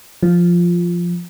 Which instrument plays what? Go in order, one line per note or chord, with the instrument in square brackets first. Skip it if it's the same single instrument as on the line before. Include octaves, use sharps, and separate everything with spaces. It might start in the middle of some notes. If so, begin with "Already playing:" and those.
[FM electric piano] F3